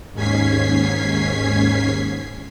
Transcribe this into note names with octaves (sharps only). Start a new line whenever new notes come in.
D#2 G#2 C#4 G#6 B6 C7